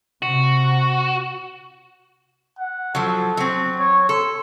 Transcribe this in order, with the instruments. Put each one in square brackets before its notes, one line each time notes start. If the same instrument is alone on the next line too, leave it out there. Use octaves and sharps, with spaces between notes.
[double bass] C3 [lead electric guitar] F#4
[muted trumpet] F#5
[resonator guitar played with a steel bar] F3 F#3 [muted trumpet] A4
[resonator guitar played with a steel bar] F#3 C4
[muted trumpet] C#5
[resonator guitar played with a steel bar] A4 [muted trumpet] C6